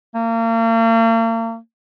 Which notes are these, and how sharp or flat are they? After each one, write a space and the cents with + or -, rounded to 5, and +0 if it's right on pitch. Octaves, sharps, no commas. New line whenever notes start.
A#3 -40